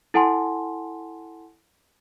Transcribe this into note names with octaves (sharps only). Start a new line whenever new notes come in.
E4 A4 F#5 G#5 A5 C6